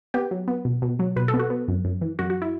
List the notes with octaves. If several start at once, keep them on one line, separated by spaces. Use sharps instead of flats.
B3 G4
F#3
B3
B2
B2
F#3
B2 B4
A4
B3
F#4
B3
F#2
F#2
E3
F#2 F#4
F#4
E4